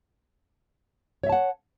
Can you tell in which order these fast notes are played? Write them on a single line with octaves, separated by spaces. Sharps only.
C#5 E5 A5 F#5